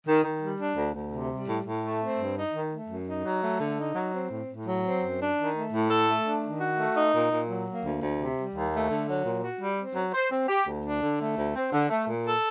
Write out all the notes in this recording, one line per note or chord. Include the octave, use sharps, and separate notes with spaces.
D#3
D#3
G3
D4
D2
D2
C3
G3
A2
A2
A3
C4
G2
D#4
D#3
A3
F#2
D#4
F#3
A3
D3
D#4
F#3
C4
A2
A2
F#3
C4
F#2
D4
D#3
A3
A2
A4
A3
D4
D#3
F#4
A3
D#4
A#2
A#2
F#3
A#3
D2
D2
C3
G3
D#2
A3
D3
F#3
A#2
F#4
G3
C4
F#3
C5
C4
G4
D2
D4
D3
A3
D2
C4
D3
A3
A#2
A4